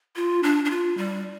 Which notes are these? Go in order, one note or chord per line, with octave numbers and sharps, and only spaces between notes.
F4
D4
D4
F4
G3